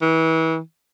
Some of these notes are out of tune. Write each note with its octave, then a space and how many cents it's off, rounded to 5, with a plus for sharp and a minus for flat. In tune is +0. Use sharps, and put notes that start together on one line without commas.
E3 -30